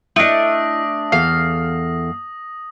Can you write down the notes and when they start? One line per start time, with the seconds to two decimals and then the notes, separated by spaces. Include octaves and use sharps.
0.16 A3 D4 E4 D#5 D#6 A#6
1.12 E2 A4 F5